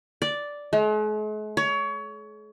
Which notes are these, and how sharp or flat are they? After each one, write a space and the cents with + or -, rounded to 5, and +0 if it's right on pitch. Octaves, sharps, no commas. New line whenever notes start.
D5 -5
G#3 +45
C#5 +25